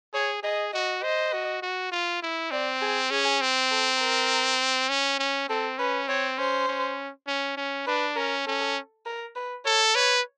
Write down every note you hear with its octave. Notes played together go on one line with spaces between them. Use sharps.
G#4 C#5
G#4 D#5
F#4 D#5
C5 D#5
F#4
F#4
F4
E4
C4 D5
G#4
C#4 G#4
C4
A4
A#4
C#4
C#4
C4 A4
C#4 B4
C4 C#5
C#4 C5
C#4
C#4
C#4
D4 B4
C#4 A#4
C#4 A4
A#4
B4
A4 C#5
B4 C#5